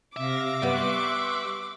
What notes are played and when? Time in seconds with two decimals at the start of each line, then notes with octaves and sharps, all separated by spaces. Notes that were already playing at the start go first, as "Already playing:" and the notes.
0.16 C3 E5 F5 D6 A#6
0.62 G3 B3 C6 C#6 F#6